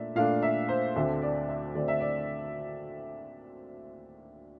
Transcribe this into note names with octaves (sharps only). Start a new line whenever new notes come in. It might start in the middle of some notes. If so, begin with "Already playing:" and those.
Already playing: A#2 A3 D4 D5 E5
A#2 A3 D4 F5
E5
C5
D2 D3 A3 C4 E5
D5
E5
D2 D3 A3 C4 D5
E5
D5